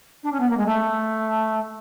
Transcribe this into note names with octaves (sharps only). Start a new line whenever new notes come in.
D4
C#4
B3
A#3
G#3
A3